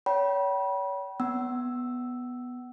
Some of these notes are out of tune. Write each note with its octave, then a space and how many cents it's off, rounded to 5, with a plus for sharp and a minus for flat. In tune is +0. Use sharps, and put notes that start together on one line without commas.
C#5 +35 G5 -35 B5 -30
B3 +0 F#5 +35 E6 +0